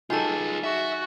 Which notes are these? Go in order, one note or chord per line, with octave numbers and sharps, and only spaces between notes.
D#3 F#3 F4 G#4 A4 G#5 A6
F#4 E5